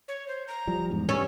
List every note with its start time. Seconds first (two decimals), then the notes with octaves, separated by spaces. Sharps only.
0.08 C#5
0.28 C5
0.48 A#5
0.67 F3 G3
0.90 E2 G#2
1.09 G2 C#4 E6